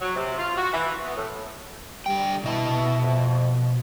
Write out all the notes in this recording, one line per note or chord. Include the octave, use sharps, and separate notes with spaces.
F#3
C3
F4
F#4
E3
B3
A2
D3 G3 G5
B2 E4 D#5 E5 A5
F2